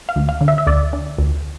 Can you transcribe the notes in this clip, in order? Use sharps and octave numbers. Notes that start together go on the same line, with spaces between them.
F5
D2
F5
D3
E5
E5
D2 D5
D3
D2